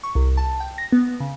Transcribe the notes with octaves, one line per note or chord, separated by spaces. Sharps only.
C#6
C2
A5
G5
A#6
B3
C#3